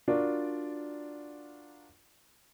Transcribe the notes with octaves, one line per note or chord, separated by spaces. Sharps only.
D4 F4 F#4 A#4 D5